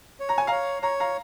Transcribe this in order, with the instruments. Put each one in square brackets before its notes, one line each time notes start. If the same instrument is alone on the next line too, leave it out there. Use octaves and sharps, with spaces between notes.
[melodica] C#5
[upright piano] A#5
G#5
[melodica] C#5 [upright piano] F5 A#5
[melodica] C#5 [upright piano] A#5
[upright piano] F5 A#5